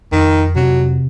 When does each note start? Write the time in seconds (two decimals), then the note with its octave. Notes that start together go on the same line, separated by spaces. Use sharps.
0.12 F2 D#3
0.56 C3 F#3